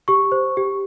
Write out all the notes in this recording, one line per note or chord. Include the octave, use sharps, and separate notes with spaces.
G4 C#6
C5
G4